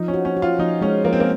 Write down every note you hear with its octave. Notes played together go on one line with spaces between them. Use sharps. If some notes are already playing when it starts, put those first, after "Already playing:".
Already playing: F3 D#4
C#4
F#4
C#4
F#4
F4
F3 D#4
G#3 C#4
F3 A#3
C4
A#3